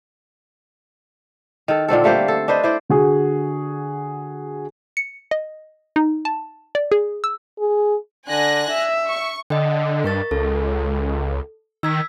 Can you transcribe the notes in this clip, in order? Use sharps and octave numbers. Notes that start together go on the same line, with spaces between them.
D#3 A4
A#2 D3 C4 A4
G3 A3 A#3 C5
A4
D4 B4 C5 D#5
E4 C5 D5
D3 F#4 G#4
C#7
D#5
D#4
A5
D5
G#4
E6
G#4
D3 G#5 F#6 A#6
E5
C#6
D3 D#5 G5
G2 A#4 C#6 A6
C#2 A4
D#3 E6 G#6 B6